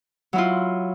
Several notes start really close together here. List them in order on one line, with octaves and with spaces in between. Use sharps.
F#3 E4 F4